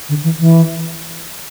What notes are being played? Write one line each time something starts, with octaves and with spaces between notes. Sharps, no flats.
D3
E3
E3